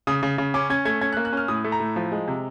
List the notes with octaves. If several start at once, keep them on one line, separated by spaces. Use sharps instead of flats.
C#3 D#6
C#3
C#3
C#4 D6
C#4 G#6
A3 G#6
C#4 G#6
F#6
A#3
F#6
C#4 F6
A2 D#6
A3
A#5
A2
F3
G#3
C3